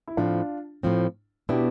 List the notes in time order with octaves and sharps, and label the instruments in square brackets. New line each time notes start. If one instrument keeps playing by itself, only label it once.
[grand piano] E4
[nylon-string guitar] A2 F3 C4 [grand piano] D4 F4
[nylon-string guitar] A2 F3 C4
[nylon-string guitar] B2 B3 D4 [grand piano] E4 G4